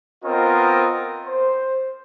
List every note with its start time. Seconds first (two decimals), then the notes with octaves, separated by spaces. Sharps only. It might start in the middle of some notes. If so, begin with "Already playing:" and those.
0.24 B3 C4 F4 A#4 D#5
1.25 C5